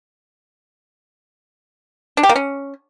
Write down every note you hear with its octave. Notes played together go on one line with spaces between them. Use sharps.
D4
G4
A#3
C#4